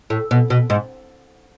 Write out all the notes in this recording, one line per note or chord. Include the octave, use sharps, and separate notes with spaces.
A2
B2
B2
G#2